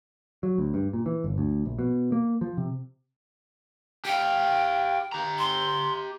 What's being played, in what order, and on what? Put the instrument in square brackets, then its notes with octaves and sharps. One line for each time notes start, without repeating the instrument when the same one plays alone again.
[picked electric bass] F#3
D2
G2
A#2
E3
G1
D2
A#1
B2
A#3
F3
C3
[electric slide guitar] G4 F5 [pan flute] G5
[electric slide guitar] G4 A#5
[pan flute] C6